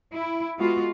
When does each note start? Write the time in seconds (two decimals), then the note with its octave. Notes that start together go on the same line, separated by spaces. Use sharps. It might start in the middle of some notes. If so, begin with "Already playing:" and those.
0.12 E4
0.58 G#3 B3 F4 F#4